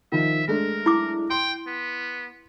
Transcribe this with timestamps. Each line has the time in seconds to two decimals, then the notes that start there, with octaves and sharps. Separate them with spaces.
0.12 D#3 F3 E5
0.48 G#3 A3 D4 A#4
0.86 E4 D6
1.30 G5 C6
1.67 B3